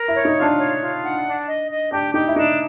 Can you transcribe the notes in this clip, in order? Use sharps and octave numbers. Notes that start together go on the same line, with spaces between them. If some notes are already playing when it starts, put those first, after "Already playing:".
Already playing: A#4
E4
C#5
D#4
F4
D4
C#5
F4
F#5
D4
D#5
D#5
D4 G4
D#4 G4
E4
D4 D#4